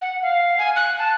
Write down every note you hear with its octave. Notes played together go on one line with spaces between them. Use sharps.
F#5
F5
G#5
F#6
A5